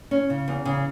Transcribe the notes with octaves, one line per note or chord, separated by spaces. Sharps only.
C#4
C#3
E2
C#3